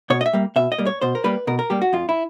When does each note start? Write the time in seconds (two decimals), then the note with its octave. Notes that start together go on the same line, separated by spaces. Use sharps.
0.10 B2 C#5
0.21 D#5
0.26 E5
0.33 G3 A#3
0.56 B2 E5
0.72 D#5
0.78 G3 A#3
0.86 C#5
1.02 B2 C5
1.15 A#4
1.24 G3 A#3 B4
1.47 B2 A#4
1.59 A#4
1.70 G3 A#3 G4
1.82 F#4
1.93 F2 F4
2.09 E4